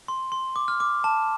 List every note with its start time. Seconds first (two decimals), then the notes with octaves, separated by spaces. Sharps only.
0.08 C6
0.32 C6
0.56 D6
0.68 F6
0.80 D6
1.04 A5